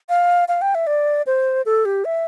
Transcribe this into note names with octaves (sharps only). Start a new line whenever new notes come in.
F5
F5
G5
E5
D5
C5
A4
G4
E5